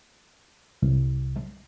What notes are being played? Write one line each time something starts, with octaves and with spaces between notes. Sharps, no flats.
C2